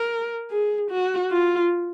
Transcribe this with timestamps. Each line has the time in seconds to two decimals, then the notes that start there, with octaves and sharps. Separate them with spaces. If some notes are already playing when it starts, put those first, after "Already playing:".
Already playing: A#4
0.51 G#4
0.91 F#4
1.31 F4